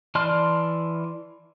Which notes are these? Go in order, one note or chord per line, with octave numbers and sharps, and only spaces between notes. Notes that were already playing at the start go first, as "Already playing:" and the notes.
E3 D5 A5 C6 F6